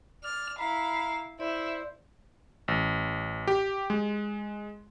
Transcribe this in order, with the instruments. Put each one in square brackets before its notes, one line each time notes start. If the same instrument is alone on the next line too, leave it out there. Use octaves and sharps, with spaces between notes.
[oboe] D5 [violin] F6
[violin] E4 F5 [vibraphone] A#5 [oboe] B5
[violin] E4 [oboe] C5 [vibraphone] D5
[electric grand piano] A1
G4
G#3